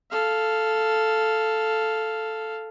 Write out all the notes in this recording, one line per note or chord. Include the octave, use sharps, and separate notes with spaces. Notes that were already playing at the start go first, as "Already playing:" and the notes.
A4 F5